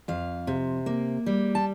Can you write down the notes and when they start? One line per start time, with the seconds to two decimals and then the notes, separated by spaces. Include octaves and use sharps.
0.08 F2 F5
0.47 C3
0.86 A#3
1.26 G3
1.55 A5